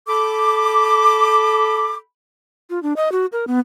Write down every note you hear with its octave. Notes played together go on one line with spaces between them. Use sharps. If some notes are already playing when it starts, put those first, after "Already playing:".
A4 B5 D6
F4
D4
D#5
F#4
A#4
B3